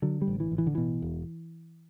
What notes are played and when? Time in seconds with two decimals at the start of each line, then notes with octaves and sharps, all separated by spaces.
0.02 D3 F#3
0.22 G3
0.28 A1
0.40 E3
0.52 A1
0.58 E3
0.67 D3
0.75 B2 E3
1.02 E1